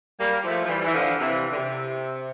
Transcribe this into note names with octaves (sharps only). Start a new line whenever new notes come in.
G3 A#3
F3 A3
F3
E3 G3
E3
D3 F3
C3 E3
D3
C3